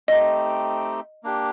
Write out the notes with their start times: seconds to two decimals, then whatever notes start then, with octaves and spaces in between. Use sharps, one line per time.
0.08 A3 C4 D#4 G4 D#5
1.24 A#3 D4 G4